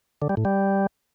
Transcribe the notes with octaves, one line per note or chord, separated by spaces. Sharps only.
D3
G3
A2
G3